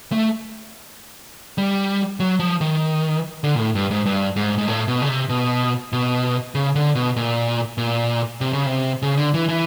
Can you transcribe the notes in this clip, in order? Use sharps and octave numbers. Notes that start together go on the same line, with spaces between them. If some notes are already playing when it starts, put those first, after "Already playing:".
A3
G3
F#3
F3
D#3
D3
A#2
A2
G2
G#2
G2
G#2
G#2
A2
B2
C#3
C3
B2
B2
C#3
D3
B2
A#2
A#2
C3
C#3
C3
C#3
D3
E3
E3